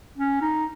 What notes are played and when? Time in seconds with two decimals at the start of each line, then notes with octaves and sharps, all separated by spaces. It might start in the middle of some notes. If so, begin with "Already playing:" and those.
0.18 C#4
0.41 D#4